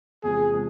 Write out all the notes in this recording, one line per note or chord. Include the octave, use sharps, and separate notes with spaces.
E2 C3 F3 G#3 G#4
C3 F3 G#3